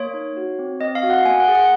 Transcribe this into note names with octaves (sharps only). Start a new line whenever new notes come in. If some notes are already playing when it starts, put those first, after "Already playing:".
Already playing: A#3 C#5
D#4
F#4
C4
C4 D#5
F5
F#4
F#5
A#3 G#5
F#5
G#4
F#5